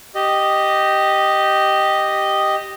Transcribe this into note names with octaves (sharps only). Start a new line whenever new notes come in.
G4 D#5